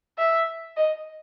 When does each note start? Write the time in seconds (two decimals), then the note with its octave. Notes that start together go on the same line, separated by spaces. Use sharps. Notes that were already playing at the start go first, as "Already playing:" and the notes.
0.18 E5
0.77 D#5